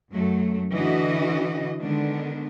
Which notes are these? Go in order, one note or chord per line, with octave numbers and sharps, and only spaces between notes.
F#2 F#3 A3
D3 E3 D4 E4 F#4 D#5
D3 D#3 G#3 B3 D4